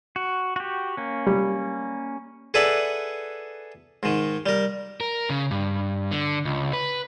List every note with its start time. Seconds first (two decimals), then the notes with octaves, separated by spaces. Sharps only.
0.16 F#4
0.56 F#4 G4
0.97 A#3 C#4
1.27 G3
2.54 G#4 A4 B4 D5 E5 F#5
4.03 G#2 D#3
4.46 G3 A#4
5.01 A#4
5.30 C#3
5.51 G2
6.11 D3
6.45 C#2
6.73 B4